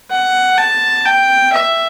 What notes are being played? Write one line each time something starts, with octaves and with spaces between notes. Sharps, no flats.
F#5
A5
G5
E5